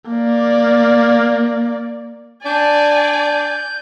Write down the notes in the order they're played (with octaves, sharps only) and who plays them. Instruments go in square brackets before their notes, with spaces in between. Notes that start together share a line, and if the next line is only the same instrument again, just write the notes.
[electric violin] A#3 D5
[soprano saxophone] D4 [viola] D5 G#5 [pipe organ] G6